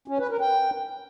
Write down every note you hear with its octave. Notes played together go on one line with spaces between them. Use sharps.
C#4
B4
A#4
G5